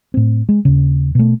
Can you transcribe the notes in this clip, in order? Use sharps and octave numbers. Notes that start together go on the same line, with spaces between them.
A2 C4
G#3
D#2 C#3
B2 A3